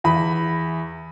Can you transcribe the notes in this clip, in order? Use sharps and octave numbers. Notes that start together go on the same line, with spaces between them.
E2 B5